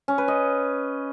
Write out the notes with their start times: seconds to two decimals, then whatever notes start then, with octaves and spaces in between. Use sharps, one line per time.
0.08 C#4
0.18 B4
0.28 D#5